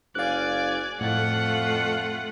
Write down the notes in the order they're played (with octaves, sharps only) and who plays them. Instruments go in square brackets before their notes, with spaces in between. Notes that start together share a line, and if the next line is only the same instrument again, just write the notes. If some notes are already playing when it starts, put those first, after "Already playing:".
[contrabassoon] F#1 [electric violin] D5 G#5 [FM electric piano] F5 F#6
[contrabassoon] F2 [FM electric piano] A2 [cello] A3 F4 [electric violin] F#5